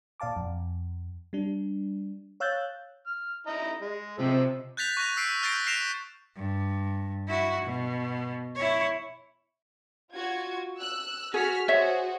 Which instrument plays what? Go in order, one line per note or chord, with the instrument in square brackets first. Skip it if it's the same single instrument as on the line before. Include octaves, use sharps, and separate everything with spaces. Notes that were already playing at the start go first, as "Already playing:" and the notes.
[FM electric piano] A#2 D5 F5 A5 D6
F2
G3 D4
C#5 F5 E6 F#6 G6 A6
[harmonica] F6
E4 D#5 A#5
G#3
[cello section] C3 [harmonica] F3 D#5 E6
[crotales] F#6 G6 A6 B6 F7
C#6 F#6 A#6 D#7 F7
E6 B6 C7 D7
F6 G6 A6 A#6 C7 D7
F6 A#6 C7 D7 E7 F7
[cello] G2
E4 F#4
B2
E4 C#5
[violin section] F4 F#4 G#6
E6 F#6
[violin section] F#4 F6 B6 [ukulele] G#4
[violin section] F#4 G#4 C5 [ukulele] C#5 E5